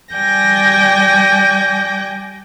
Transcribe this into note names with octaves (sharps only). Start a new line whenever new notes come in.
G3 D5 G5 G#5 G6 A#6